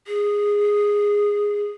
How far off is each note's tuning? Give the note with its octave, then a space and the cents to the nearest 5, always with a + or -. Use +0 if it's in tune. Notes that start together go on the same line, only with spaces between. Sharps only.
G#4 -10